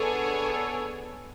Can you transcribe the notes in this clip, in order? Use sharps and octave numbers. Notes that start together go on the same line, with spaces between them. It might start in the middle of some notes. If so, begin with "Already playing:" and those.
Already playing: B3 D4 G#4 A4 C#5 G#5